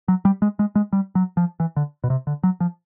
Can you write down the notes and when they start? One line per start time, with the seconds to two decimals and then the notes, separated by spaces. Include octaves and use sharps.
0.08 F#3
0.25 G3
0.42 G#3
0.59 G#3
0.75 G#3
0.93 G3
1.15 F#3
1.37 F3
1.60 E3
1.76 D3
2.04 B2
2.10 C3
2.27 D3
2.43 F#3
2.60 F3